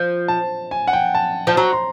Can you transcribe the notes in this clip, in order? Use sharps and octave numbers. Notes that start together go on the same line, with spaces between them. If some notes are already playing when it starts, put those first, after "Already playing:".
Already playing: F3
A5
G#5
F#5
G5
A5
F3 A5
F#3 A#5
C6